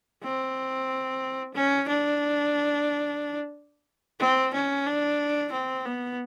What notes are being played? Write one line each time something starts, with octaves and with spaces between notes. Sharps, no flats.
C4
C#4
D4
C4
C#4
D4
C4
B3